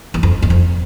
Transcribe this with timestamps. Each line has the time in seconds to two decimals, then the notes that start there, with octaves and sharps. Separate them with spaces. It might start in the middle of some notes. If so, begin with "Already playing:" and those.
0.14 E2
0.23 F2
0.42 E2
0.50 F2